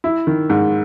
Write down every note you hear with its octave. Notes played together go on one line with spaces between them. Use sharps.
E4
D#3
G#2